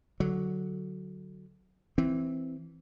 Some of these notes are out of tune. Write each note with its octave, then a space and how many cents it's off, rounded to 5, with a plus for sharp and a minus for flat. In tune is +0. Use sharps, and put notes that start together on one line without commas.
D3 +0 F#3 +0
E3 +0 C4 +0